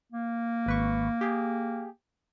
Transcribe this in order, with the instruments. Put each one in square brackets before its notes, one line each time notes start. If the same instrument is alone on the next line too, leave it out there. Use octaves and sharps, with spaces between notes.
[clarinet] A#3
[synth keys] G#1 B4 C#6
G4 G#4